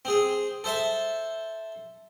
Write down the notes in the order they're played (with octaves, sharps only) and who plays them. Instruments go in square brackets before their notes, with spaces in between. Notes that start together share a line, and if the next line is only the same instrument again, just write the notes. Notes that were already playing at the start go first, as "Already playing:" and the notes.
[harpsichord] C4 G#4
A4 C5 E5 A5